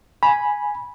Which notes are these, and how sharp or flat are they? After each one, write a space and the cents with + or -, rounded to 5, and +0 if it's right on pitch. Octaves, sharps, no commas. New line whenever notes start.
G#5 +0 B5 -15